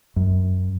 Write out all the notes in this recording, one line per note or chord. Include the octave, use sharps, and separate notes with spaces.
F#2